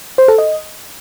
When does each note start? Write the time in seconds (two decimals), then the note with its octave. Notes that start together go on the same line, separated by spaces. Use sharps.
0.18 C5
0.28 A4
0.38 D#5